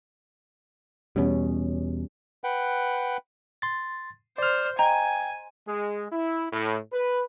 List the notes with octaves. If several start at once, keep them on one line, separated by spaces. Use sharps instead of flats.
E2 B2 G3 C#4
B4 F#5 G5
C6 A6
C5 D5 F6
D#5 G5 G#5 A#5
G#3
E4
A2
B4